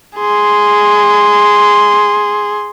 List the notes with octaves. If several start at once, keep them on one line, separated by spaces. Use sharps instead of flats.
G#4 C6